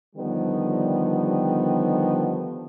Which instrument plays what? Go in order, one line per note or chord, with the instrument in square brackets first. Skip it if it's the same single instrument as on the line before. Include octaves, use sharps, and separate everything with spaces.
[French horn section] D3 D#3 F3 G3 B3